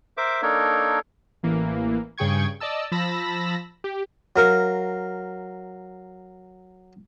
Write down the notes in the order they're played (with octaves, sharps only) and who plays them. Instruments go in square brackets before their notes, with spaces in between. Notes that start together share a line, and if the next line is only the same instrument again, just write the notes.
[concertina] A#4 C5 E5 D6
A#3 D4 D#4 A4 A#4 C#5
[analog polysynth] A1 E3 A#3
G2 C#3 G#4 G5 C#6 G#6
D5 D#5 A5 E6
F3 A5 B5 E6 A#6
G4
[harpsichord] F#3 A#4 F5